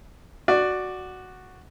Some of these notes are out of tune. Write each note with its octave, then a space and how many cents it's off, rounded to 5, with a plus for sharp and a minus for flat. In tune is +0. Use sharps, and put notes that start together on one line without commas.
F#4 +0 D5 +10